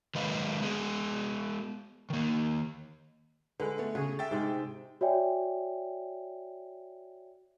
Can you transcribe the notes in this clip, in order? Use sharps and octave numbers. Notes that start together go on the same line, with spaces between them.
D#3 F#3 G#3 B4 D#5 F5
G#3 B3 G#4
D#3 A#3
D3 G#3 B4
A3 B3
C#3 F#4 G#4
E5 G5 A6
G#2 C3 G#3
F#4 C#5 D5 E5 G5 G#5